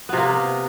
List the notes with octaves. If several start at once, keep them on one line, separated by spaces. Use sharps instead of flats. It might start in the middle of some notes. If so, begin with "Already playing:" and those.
C3 A#3 B3